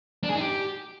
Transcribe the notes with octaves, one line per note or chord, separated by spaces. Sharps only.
D4
G#4
D#4
G4